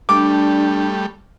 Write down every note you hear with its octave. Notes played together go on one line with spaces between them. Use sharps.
G3 A3 D4 D6